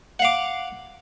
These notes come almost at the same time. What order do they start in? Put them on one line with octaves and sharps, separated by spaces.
F#5 F5 D6